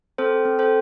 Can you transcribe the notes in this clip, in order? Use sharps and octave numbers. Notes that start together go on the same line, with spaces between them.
C4 A4 C5
C4
A4 C5